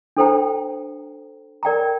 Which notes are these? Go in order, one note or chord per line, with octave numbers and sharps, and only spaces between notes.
D4 A4 C5 G5 A#5
A#4 D5 G5 A#5